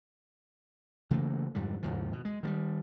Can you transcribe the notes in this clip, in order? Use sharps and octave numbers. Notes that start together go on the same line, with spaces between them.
C#3 E3 A3 A#3
F2 G#2 D3 G3
D#2 G#2 C#3 F3
B2
G#3
D#3 F#3 G3